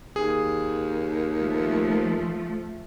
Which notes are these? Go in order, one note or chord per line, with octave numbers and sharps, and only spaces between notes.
D#2 G#4
F3 A3